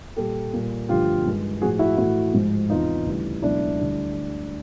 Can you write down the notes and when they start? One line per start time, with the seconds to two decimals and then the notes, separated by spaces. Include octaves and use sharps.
0.16 A#2 G3 G4 A4
0.53 A#2 G3
0.89 G2 D3 F3 A3 F4 G4
1.25 G2 D#3 G#3
1.61 A2 F3 A3 F#4 G#4
1.79 E4 F#4
1.97 A2 E3 A3 E4 F#4
2.33 G#2 F3 G#3
2.69 E2 C3 E3 D#4 F4
3.06 D2 C#3 E3 G3
3.42 C#2 B2 F#3 A3 D4 E4
3.78 D2 D3 G3